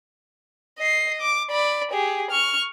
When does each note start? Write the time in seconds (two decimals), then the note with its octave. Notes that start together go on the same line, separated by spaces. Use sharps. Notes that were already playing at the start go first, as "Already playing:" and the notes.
0.79 D#5 C7
1.21 D6
1.51 D5 B5
1.92 G4 G#4
2.31 C#6 F6